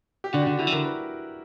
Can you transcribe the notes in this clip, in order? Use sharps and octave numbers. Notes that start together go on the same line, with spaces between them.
G4
D3 D4 F#4
G4
D3 D4 F#4
D3 E4 G4
E3
D3 A#4
B4